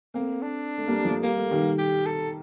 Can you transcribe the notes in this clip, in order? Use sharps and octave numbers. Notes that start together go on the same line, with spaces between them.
A3 A#3 C4
D4
A3
G3 A#3
G3
F3 A3
G3 A#3
A3
D#3 G3
G4
A4